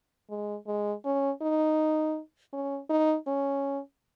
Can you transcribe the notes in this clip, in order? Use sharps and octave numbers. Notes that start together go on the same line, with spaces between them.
G#3
G#3
C#4
D#4
C#4
D#4
C#4